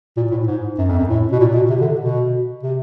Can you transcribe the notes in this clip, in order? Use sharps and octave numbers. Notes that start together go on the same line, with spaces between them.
A#2
A2
G#2
F#2
F2
F#2
A2
B2
A#2
B2
C3
D3
B2
C3